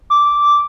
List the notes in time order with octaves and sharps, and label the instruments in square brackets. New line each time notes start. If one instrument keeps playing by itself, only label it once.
[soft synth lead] D6